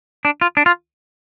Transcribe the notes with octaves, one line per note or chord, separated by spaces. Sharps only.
D4
F4
D4
F4